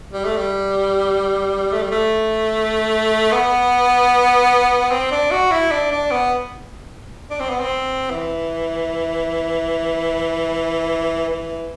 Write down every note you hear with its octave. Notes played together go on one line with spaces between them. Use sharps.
G3
A3
G3
A3
G3
A3
B3
C4
D4
F#4
E4
D4
D4
B3
D4
C4
B3
C4
E3
E3